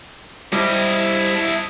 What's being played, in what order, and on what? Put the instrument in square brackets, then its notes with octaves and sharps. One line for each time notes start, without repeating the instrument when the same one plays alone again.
[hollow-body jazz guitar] G3 [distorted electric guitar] E4 D#5 [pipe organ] G4 C5 A5